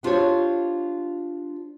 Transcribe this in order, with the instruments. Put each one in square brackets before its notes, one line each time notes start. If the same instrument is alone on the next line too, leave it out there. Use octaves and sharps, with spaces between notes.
[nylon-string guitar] B3 D4 F4 G4 C5 C#5